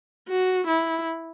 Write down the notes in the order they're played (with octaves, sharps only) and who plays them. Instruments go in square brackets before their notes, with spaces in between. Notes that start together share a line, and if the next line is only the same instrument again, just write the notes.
[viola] F#4
E4